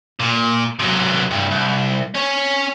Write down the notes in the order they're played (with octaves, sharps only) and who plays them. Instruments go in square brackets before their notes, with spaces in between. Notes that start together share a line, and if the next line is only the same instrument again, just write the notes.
[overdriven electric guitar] A#2
C3 F#3
C2 G2
C2
C#4 C#5